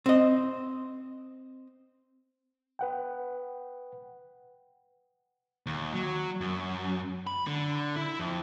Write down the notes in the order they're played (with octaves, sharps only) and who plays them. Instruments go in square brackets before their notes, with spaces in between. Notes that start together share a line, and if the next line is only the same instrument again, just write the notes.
[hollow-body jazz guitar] C4 D#5
[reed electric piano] B4 F#5 G5
[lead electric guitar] D#2
F#3
F#2
B5
D3
E4
F2